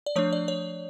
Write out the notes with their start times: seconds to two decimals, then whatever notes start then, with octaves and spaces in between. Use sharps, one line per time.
0.06 D5
0.16 F3 A3 D4 C#5
0.33 D5
0.48 C#5